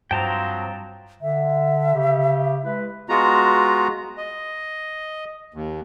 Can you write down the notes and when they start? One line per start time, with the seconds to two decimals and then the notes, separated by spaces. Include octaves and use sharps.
0.11 G2 F3 F#3 C4 G5 A5 A#5
1.22 D3 E5
1.95 C#3 G4
2.63 G#3 E4 B4
3.09 G#3 B3 F4 F#4 A#5
4.18 D#5
5.54 D#2